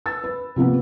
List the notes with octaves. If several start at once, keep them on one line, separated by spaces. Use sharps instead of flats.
E6 A6
B4
C3 F3 A#3 B3